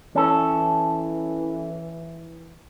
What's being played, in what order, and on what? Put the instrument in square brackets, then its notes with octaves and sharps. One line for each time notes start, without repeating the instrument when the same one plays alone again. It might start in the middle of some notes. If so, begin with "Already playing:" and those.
[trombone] E3 [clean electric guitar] C#4 A4